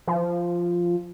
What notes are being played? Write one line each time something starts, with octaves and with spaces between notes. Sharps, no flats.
F3